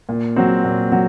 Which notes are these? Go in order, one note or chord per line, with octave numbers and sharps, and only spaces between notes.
A#2
F#3 C4
A#2
F#3